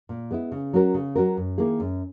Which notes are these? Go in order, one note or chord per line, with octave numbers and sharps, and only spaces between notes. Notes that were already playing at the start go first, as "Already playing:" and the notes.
A#2
G#3 B3 E4
C#3
F#3 C#4 F#4 A#4
C#3
F#3 C#4 F#4 A#4
F#2
D#3 A#3 E4 G#4
F#2